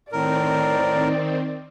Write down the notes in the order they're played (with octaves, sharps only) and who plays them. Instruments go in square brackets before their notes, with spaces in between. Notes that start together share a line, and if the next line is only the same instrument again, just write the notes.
[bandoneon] A2 A#4 [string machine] D#3 C4 [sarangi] D5